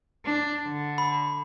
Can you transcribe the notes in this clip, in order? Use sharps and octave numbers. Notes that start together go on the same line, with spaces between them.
D4
D3
B5